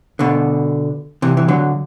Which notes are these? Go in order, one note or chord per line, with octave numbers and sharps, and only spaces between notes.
B2 D3
C3 E3
E3
D3 F#3